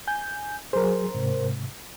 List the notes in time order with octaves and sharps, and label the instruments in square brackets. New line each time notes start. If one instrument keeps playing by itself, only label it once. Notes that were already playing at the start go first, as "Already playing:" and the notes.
[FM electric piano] G#5 G6
[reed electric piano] F#3 G#4 [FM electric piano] A#4 C5
[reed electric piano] G#2 C3